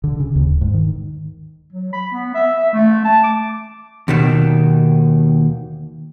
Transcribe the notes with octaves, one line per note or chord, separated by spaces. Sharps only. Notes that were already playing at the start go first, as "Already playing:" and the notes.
D3
C#3
D#2
D1
G#2
D#3
F#3
B5
B3
E5
E5
A3
A5
D6
D#2 B2 D#3